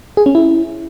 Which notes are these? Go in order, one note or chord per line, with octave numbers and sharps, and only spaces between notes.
G#4
C#4
E4